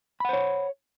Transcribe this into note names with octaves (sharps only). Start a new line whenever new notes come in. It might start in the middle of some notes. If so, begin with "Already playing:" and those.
C5 C#5 F#5 B5